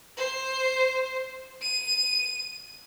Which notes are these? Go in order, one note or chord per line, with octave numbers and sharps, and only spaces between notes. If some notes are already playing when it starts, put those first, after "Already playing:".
C5
D#7